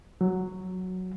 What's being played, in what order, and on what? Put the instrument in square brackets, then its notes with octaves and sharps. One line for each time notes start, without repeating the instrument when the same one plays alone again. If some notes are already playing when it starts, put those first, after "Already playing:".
[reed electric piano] F#3